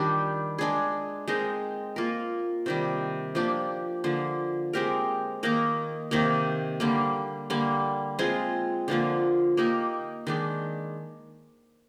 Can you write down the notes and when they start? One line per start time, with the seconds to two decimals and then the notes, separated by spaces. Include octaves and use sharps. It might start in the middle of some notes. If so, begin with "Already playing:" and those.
Already playing: D#3 G3 D4 G4
0.58 G#3 D4 G#4
1.28 G#3 C4 D#4 A#4
1.96 A#3 F4 A#4
2.66 C3 D#3 G3
3.35 F3 A#3 D4 G4
4.04 D3 F3 A#3
4.73 G#3 C4 G4 A#4
5.43 D#3 A#3 D#4 A#4
6.11 C3 D#3 A#3
6.80 D3 G3 A#3
7.50 D3 G3 A#3
8.19 G#3 C4 F4 G#4
8.88 D3 F3 A#3 F4
9.57 A#3 D#4 G4 A#4
10.27 D#3 G#3 D4